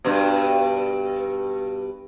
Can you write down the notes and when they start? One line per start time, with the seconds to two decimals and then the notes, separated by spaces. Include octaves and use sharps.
0.05 G2 B2